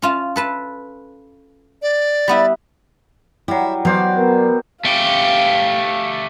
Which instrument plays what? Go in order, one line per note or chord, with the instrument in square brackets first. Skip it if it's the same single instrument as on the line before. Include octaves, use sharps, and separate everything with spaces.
[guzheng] C#4 F4 A5
A4 B4 A5
[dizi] D5
[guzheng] G3 B3 E4
[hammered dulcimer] F#3 G3 [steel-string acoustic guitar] E4
[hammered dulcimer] B2 C5 D6 [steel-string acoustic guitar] F#3 D5
[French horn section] B3 A#4
[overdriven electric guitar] A3 G4 [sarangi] F5